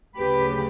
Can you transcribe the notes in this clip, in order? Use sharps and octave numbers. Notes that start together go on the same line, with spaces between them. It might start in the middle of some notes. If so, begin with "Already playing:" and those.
D2 C#3 F#3 G4 B4